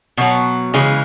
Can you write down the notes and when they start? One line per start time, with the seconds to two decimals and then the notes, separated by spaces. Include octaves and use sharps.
0.17 B2 F#3
0.74 C#3 E3 G#3